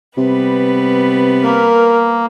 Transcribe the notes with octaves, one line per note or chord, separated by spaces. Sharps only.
C3 G3 B3 B4
A#3 A#4